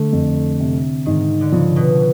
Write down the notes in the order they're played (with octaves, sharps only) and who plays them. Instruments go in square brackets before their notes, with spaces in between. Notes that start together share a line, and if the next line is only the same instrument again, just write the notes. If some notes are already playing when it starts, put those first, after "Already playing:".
Already playing: [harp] D3 [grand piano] A3
[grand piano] F2
C3
[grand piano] G#2 [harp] D#3
[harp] D3
[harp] C#3 [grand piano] F3
[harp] B2